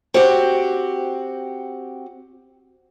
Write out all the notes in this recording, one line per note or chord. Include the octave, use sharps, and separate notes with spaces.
C4 F#4 G4